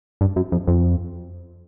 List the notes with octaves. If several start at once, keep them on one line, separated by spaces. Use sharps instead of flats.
G2
F#2
F2
F2